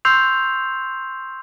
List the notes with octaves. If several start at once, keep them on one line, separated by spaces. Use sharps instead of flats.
C6 C#6 E6 G6 C7 F7